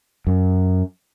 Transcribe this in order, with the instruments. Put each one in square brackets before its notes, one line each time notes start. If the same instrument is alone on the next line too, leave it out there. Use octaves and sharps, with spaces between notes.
[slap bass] F#2